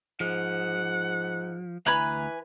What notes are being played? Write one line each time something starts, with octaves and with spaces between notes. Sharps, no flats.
G#2 F3 F#5
D2 E3 B4 G#5 A#5 F#6